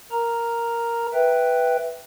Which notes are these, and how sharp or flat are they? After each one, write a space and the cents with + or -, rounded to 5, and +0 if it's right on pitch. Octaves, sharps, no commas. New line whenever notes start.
A#4 +0 A#5 +0
B4 +0 E5 +0 G5 +0